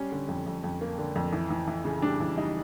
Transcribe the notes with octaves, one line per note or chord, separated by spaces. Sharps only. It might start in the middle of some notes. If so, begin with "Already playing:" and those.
Already playing: G3 C#4
D3
F2
F2
F2
A#3
D3
F2
E3
E3
E3
C#3
G3 D4
E3
G3 D#4